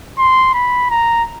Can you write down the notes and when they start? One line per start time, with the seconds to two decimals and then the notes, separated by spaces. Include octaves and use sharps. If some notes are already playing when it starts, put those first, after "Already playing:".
0.18 C6
0.54 B5
0.90 A#5